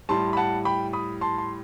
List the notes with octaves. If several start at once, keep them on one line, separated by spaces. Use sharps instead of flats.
A2 G3 A5 C6
B5
F#5 A5
G5 B5
B5 D#6
A5 C6
C6